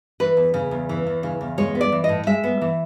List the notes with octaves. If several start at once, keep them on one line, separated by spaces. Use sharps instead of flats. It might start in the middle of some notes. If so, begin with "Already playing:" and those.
E3 B4
E2
C#3
E2
E3
E2
C#3
E2
G#3 C#5
B3
D5
E3
A2 D#5
G#3 E5
B3
E3